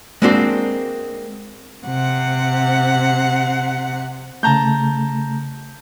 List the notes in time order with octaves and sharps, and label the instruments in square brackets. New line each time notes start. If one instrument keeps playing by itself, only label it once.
[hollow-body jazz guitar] G#3 A#3 C4 D4 F#4 C5
[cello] C3 F#5
[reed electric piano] C#3 A3 [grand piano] A5 A#5 G6